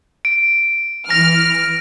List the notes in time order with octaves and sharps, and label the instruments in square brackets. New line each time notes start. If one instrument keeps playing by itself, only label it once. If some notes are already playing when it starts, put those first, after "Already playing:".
[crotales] D7
[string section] E3 F6 [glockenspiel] A#6